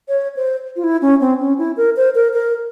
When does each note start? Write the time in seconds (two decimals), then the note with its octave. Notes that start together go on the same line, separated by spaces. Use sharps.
0.08 C#5
0.36 C5
0.76 F4
0.84 E4
1.02 C#4
1.21 C4
1.40 C#4
1.59 E4
1.77 A#4
1.97 C5
2.15 A#4
2.33 A#4